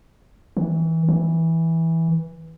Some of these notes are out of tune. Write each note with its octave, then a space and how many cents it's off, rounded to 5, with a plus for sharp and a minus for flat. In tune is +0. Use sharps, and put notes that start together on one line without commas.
E3 -20
E3 -10